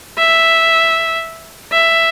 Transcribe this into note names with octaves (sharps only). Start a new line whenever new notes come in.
E5
E5